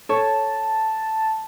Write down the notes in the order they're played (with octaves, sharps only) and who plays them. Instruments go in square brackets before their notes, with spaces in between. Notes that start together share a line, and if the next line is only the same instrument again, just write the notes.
[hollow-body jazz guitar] A4 C#5 [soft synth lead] A5